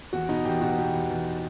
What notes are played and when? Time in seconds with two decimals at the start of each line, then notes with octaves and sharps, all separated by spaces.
0.13 E2 F#4
0.29 B2 D#4
0.45 E2 G4
0.61 B2 F#4
0.77 B2 G4
0.94 E2
1.10 E2